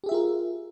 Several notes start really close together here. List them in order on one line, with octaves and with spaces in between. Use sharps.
G4 G#4 E5 F4 A#4